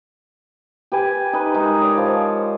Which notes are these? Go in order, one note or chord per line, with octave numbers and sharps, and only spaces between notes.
G4 B4 G#5
D#4 B4
G#3 D#4 A#4
C#5 D5
F3